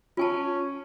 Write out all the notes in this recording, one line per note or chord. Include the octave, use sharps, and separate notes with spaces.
C#4 F4 G#5 A5